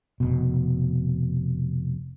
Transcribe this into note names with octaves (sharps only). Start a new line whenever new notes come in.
F1 B2